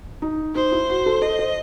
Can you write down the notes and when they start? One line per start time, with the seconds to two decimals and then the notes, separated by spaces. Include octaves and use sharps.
0.22 D#4
0.55 D#4 C5
0.72 E4
0.89 F#4
1.06 A4
1.22 A4 D#5
1.39 C5